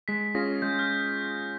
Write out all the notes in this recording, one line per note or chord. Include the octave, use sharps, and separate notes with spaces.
G#3 B6
C#4 F4 G#4 A#6
G#3 G6
F6